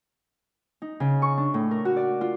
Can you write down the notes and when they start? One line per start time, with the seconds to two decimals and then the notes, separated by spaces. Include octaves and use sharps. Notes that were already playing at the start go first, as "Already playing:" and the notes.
0.82 D#4
1.00 C#3
1.22 C#6
1.38 D4
1.54 A2
1.71 A#4
1.85 F#4
1.97 D5
2.21 F4